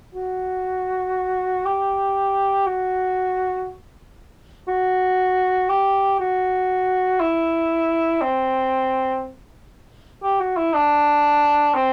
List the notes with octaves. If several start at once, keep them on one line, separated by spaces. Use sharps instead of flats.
F#4
G4
F#4
F#4
G4
F#4
E4
C4
G4
F#4
E4
D4
C4